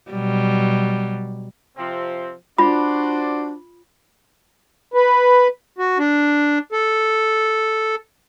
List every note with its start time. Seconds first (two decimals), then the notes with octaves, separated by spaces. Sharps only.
0.12 B2 F#3 G3
1.77 C3 F3 C4
2.58 D4 F4 F#4 C5 D5 B5
4.94 B4
5.79 F#4
5.99 D4
6.72 A4